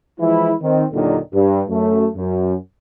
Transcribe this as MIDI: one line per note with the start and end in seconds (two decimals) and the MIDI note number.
0.20 0.54 52
0.20 0.54 53
0.20 0.54 56
0.20 0.54 64
0.62 0.85 51
0.62 0.85 60
0.93 1.18 39
0.93 1.18 46
0.93 1.18 50
0.93 1.18 51
0.93 1.18 54
0.93 1.18 62
1.34 1.63 43
1.69 2.07 42
1.69 2.07 57
2.17 2.55 42